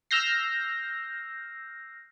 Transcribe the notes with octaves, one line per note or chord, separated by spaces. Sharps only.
E6 F6 G6 A#6 C7